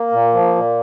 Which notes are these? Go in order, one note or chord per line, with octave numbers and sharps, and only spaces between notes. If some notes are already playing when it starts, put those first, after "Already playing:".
Already playing: A#3
A#2
F3
A#2